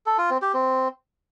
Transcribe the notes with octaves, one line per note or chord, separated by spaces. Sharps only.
A4
F4
C4
G4
C4